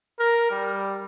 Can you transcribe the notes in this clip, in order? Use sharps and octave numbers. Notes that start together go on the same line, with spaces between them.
A#4
G3